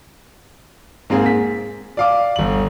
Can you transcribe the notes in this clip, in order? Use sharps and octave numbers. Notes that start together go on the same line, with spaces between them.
G#2 A#3 C4 G#4
B6
D5 F5 D6
G1 F#7